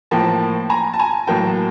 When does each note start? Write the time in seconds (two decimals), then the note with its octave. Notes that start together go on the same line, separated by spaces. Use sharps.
0.11 A2 F3 A#3 G5 A5
0.69 G#5 A#5
0.94 A5
0.99 G#5 A#5
1.27 A2 F#3 A#3 G5 A5